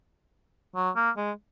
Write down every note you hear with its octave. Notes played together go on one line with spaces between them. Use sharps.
F#3
A#3
G#3